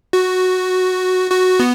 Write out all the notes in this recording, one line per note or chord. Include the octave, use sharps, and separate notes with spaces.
F#4
F#4
B3